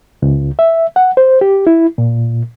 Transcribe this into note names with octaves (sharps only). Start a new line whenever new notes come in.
C#2
E5
F#5
C5
G4
E4
A#2